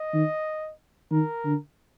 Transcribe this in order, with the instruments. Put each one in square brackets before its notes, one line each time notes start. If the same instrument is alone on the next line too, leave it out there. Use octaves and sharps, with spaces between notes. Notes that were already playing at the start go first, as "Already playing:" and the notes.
Already playing: [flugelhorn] D#5
[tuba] D#3
[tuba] D#3 [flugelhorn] A#4
[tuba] D3